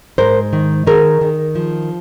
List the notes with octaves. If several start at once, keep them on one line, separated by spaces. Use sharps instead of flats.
G#2 A#4 C5
D#3
D#3 G#4 A#4
D#3
F3